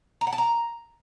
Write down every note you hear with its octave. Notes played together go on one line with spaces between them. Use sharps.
A#5
F#5
A5
A#5